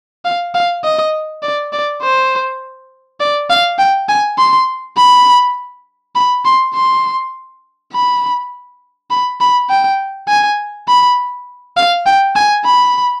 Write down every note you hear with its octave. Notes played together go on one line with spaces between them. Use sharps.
F5
F5
D#5
D5
D5
C5
D5
F5
G5
G#5
C6
B5
B5
C6
C6
B5
B5
B5
G5
G#5
B5
F5
G5
G#5
B5